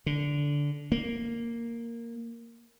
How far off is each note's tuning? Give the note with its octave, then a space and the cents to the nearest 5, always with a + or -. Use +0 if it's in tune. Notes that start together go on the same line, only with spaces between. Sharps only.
D3 -15
A#3 -5